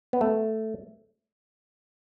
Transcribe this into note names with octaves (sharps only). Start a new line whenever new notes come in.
B3
A3